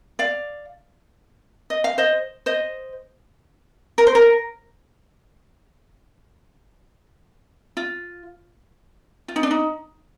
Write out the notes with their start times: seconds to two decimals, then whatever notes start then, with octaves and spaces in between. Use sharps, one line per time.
0.19 D5 F5
1.70 D#5
1.84 F5
1.98 C5 D#5
2.46 C5 D#5
3.98 A#4
4.07 C5
4.15 A#4
7.77 F4
9.28 F4
9.36 D#4
9.43 D4
9.51 D#4